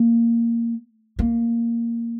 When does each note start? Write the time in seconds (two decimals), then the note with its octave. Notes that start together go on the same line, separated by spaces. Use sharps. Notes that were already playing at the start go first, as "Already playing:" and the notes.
Already playing: A#3
1.19 A#3